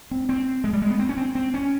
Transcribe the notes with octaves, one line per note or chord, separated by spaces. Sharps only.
C4
C4
G#3
G3
G#3
B3
C4
C#4
C4
C4
C#4